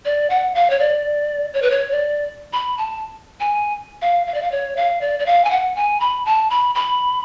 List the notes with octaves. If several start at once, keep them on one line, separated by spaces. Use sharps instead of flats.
D5
F#5
F5
C#5
D5
C#5
B4
C#5
D5
B5
A5
G#5
F5
F5
D5
F5
C#5
F5
D5
D5
F5
G#5
F#5
G#5
B5
A5
B5
B5